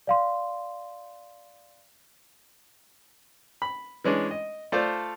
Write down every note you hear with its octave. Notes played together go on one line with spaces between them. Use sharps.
D5 F5 C6
B5
E3 G#3 C#4 D4
D#5
A3 F4 A4 C5 D5 F5